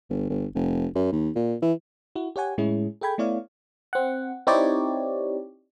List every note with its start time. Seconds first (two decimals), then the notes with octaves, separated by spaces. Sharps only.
0.10 G1
0.30 G1
0.55 F1
0.95 F#2
1.13 D#2
1.35 A#2
1.62 E3
2.15 E4 F#4
2.36 G4 C#5 F#5 G#5
2.58 A2 G#3 C#4 E4 G#4
3.01 G#4 A4 G5 B5 G#6
3.18 A3 B3 E4 C#5 D5 F5
3.93 C4 F#5
4.47 C4 D#4 E4 G4 C#5 D5